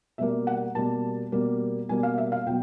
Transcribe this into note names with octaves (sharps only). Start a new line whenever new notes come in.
B2 G3 A#3 E5
F#5
B2 G3 A#3 A5
B2 G3 A#3
B2 G3 A#3 G#5
F5
E5
F5
B2 F#3 G5